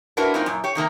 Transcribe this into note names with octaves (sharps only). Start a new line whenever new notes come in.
D4 E4 F#4 A#4 B4
F#2 A#3 C4 D#4 F4
F#2 A#2
G4 C#5
C3 D#3 A#3 A#5